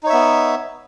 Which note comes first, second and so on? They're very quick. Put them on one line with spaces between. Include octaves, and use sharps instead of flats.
D#4 C#5 E5 B3